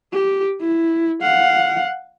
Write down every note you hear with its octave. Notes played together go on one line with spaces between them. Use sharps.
G4
E4
F5 F#5